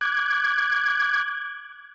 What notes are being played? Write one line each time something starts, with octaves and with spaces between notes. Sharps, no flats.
D6 F#6 G#6